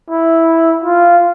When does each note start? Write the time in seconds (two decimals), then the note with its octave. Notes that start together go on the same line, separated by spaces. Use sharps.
0.10 E4
0.84 F4